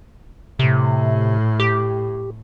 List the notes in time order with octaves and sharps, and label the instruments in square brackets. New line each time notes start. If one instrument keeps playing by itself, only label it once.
[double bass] A2 [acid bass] C3
[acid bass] G4